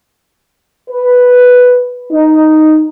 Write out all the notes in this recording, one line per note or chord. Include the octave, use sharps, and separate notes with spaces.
B4
D#4